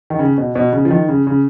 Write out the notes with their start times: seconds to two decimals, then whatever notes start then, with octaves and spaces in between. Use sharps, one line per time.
0.10 D#3
0.19 C#3
0.38 B2
0.56 B2
0.72 C#3
0.85 F3
0.91 D#3
1.09 C#3
1.27 C#3